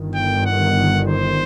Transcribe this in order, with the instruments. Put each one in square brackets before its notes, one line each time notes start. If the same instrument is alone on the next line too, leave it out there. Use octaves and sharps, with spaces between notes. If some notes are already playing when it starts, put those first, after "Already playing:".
Already playing: [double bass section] G1 G2 D#3
[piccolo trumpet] G5
F#5
C5